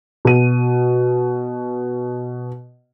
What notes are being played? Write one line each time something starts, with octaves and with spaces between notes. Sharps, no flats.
B2 D#7